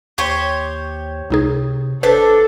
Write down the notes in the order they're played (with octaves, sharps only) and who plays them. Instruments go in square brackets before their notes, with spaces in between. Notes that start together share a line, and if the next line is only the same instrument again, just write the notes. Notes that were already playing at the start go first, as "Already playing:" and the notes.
[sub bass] D#2 [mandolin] G4 C5 C#5
[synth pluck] C#2 D#4 G#4 [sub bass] C3
[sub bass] G1 [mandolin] D4 D5 [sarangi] A4 [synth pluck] B4 C5